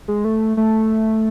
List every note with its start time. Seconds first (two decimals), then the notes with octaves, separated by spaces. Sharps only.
0.08 G#3
0.25 A3
0.57 A3